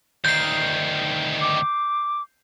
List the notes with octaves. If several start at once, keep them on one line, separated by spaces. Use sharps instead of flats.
D2 D#3 G6 C7
D6